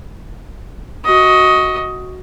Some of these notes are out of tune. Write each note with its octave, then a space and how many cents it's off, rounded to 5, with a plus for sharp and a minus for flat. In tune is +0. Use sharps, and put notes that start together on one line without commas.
F#4 +0 D#5 +15